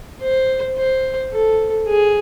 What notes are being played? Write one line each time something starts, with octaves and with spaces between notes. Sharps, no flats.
C5
C5
A4
G#4